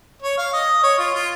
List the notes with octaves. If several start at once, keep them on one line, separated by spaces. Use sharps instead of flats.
C#5
F5
D#5
C#5
F4
F4